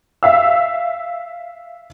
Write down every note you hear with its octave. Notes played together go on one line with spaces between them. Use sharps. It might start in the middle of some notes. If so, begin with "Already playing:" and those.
E5 F5 E6